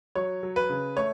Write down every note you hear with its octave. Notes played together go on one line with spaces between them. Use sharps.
F#3 C#5
F#3
B4
C#3
A3 C#5